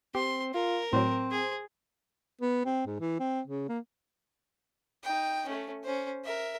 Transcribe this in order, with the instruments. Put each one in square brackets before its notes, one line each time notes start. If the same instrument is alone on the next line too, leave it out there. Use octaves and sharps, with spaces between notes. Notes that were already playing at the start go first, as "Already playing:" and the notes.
[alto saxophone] C4 [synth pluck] G4 [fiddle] C6
[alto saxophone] F4 [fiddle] A#4
[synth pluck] A2 F#3 [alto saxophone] C4 [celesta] C5 C6
[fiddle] G#4
[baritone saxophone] B3
C4
G#2
E3
C4
C#3
A#3
[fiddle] D#4 G5
A3 C#4
C#4 C5
A#4 E5